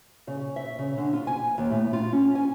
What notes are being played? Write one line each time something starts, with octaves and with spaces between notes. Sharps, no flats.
C#3
E5
C#3
D3
F4
G#5
D#2
A2
F4
C#4
G#5